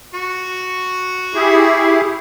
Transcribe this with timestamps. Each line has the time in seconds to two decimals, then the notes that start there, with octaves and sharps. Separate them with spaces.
0.14 F#4 C#6
1.35 E4 G4 G#4